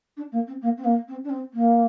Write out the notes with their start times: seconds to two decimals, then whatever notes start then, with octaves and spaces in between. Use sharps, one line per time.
0.16 D4
0.31 A#3
0.47 C4
0.61 A#3
0.77 C4
0.84 A#3
1.08 C4
1.24 D4
1.29 C4
1.53 A#3